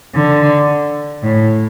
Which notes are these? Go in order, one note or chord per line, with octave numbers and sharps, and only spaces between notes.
D3
A2